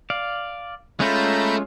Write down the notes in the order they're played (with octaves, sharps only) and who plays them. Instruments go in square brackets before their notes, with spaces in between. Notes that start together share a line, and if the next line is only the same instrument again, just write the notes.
[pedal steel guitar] D5 F5
[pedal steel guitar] G#3 C#4 F4 [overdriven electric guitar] A3 [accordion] A#5 B5 G6